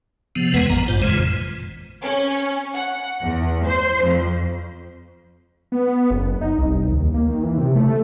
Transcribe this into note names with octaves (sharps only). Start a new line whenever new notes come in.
C3 F3 B3
F2 E3 G#3 B3 B4 F#5
G#1 A#2 B3 A#5
G#1 G2 F4 C5
F2 A#2 C#3 E3 G#3
C#4
F#5
E2
C5
F2
B3
F#1
D#4
C2
D#2
A#3
D#3
E3
C3
A3